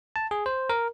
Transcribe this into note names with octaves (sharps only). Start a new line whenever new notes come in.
A5
G#4
C5
A#4